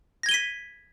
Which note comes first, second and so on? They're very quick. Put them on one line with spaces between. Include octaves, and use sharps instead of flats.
A#6 G#6 G7 D#7 B6